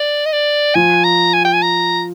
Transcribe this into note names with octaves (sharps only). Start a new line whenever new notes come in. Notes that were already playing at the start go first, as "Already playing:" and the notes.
Already playing: D5
D#5
D5
F3 G#5
A#5
G#5
G5
G#5
A#5